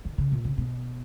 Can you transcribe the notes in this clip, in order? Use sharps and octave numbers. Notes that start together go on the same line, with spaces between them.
D#3
C#3
A#2
C#3
B2